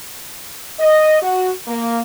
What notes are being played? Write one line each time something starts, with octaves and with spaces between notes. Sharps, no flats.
D#5
F#4
A#3